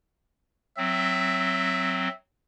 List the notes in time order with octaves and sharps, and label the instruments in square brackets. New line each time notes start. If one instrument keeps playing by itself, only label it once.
[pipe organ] F#3 C4 [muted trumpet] E5